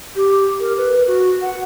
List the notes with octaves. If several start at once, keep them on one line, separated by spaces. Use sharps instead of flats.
G4
A#4
B4
F#4
F#5